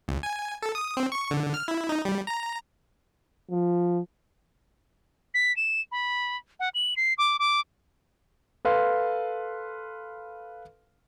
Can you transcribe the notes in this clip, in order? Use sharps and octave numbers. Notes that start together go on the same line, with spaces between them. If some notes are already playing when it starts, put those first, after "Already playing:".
C#2
G#5
A4
D#6
C4
C#6
D3
F6
E4
D#4
G3
A#5
F3
B6
E7
B5
F#5
F#7
C7
D6
D6
A4 B4 F5 C6